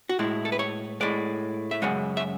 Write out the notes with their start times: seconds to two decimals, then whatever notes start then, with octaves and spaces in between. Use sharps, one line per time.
0.09 F#4
0.19 A2 G#3 E4
0.45 A4
0.52 B4
0.59 C#5
1.01 A2 G#3 D5
1.71 E5
1.82 F#2 C#3 G#3 F#5
2.17 E5